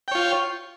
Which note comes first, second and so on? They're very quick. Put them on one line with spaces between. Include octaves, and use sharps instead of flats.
G5 C#5 F4